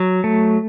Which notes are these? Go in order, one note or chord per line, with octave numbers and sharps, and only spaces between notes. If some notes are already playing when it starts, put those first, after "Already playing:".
Already playing: F#3
A3